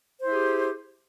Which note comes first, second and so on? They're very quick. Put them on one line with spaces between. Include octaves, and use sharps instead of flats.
C5 E4 G#4 G4